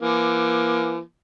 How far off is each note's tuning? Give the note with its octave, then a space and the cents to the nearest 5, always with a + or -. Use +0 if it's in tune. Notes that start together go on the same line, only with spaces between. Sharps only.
E3 +35 A#3 +30